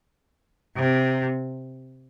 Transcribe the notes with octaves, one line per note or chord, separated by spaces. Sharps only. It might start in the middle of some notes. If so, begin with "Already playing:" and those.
C3